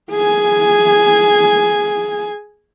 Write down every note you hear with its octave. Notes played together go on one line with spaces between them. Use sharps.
G#4 G#5